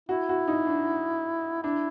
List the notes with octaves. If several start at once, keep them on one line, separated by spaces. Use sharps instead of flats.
E4 F#4
F#4
D#4
D4
D4 E4